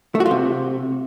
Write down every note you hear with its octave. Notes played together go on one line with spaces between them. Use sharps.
A3
F#4
F4
C3